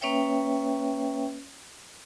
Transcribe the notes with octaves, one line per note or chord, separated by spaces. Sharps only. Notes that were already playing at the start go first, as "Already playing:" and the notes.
A#3 C#4 B4 C#5 E5 G5